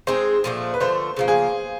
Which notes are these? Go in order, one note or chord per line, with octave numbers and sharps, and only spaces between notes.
G#3 C4 D#4 G#4 C5
A#2 F3 A3 D4
B4
D3 F3 A3 C5
C#3 F3 A#3
G#4